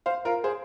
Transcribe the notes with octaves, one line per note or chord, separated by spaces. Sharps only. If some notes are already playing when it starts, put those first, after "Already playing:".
C5 F5
F4 A#4
G#4 C5